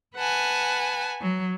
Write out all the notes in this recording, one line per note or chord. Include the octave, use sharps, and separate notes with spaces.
B4 F#5 G#5 A5
F#3